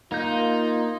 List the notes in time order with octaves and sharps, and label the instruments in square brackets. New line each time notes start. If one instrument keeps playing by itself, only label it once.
[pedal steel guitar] A#3 G6 [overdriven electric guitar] D#4 [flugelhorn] F4